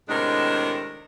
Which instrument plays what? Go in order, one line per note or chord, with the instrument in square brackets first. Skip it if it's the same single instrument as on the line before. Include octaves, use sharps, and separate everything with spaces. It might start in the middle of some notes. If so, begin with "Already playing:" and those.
[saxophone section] A2 C3 D#3 G#3 D4 A#4